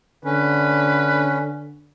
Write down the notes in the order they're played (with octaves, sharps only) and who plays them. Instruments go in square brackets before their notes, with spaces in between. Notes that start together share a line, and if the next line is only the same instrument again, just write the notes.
[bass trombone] D3 [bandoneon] C#4 [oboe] B4